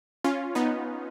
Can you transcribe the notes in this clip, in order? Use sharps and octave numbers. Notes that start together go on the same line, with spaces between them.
C#4 F4
B3 D#4